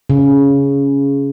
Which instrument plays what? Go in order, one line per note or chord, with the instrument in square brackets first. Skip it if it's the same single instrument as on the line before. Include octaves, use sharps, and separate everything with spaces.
[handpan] C#3